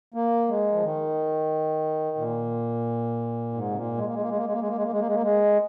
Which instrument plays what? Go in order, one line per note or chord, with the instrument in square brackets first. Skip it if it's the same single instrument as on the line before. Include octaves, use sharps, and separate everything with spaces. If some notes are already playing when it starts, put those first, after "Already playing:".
[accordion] A#3
G#3
F3
D#3
A#2
G#2
C3
A#2
G#3
A#3
G#3
A#3
G#3
A#3
G#3
A#3
G#3
A#3
G#3
A#3
G#3
A#3
G#3
A#3
G#3